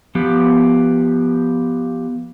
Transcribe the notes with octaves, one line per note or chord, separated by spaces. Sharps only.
F3 B3 G4